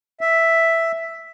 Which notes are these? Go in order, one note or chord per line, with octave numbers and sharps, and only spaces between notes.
E5